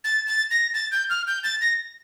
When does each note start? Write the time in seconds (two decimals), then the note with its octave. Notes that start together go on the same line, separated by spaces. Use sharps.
0.04 A6
0.27 A6
0.51 A#6
0.74 A6
0.92 G6
1.10 F6
1.27 G6
1.43 A6
1.61 A#6